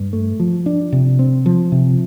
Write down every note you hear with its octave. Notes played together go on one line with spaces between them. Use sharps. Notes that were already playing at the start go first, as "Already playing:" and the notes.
Already playing: G2
A3
F3
D4
C3
C4
F3
C3